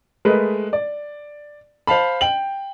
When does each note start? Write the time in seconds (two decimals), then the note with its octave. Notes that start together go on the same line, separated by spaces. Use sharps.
0.25 G#3 A3 A#4 B4 D#5
0.73 D5
1.87 C5 F5 A5 B5
2.21 G5 F#7